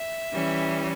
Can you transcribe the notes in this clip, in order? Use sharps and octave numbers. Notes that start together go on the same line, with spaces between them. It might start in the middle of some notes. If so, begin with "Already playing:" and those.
Already playing: E5
E3 G3 C#4